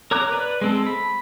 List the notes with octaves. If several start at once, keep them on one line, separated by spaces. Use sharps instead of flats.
A#4 C#5 A#5 D6 F#6
B4 D5
G#3 C4 A4
B5